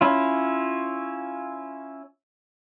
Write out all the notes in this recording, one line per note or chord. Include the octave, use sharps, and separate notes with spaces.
C#4 E4 F4